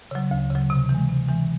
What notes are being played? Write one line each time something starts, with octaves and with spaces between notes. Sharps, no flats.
C#3 F#3
D2
C#3 F#3
C3
E3
G#3
C3
E3 G#3